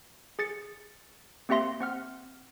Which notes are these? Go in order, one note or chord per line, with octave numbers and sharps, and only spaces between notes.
G#4 A6 C#7
A#3 C4 G4 E5 C6 A#6
C4 F#5 F6